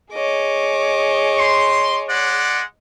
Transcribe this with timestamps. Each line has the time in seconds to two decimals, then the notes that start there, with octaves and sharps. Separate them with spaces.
0.14 G#4 C#5 D#5 D6
1.38 C6
2.08 G#3 D5 F#5